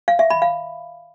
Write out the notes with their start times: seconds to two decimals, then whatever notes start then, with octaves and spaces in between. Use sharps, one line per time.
0.08 F5
0.19 E5
0.30 B5
0.42 F5